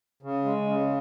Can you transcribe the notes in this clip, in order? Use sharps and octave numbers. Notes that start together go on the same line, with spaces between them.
C#3
G#3
C#3